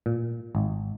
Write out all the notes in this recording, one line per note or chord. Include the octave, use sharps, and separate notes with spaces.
A#2
G#1